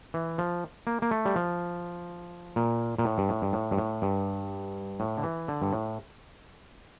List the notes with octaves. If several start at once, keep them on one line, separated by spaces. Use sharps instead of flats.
E3
F3
A#3
A#3
A3
G3
F3
A#2
A#2
A2
G2
A2
G2
A2
G2
A2
G2
A2
D3
E3
D3
G2
A2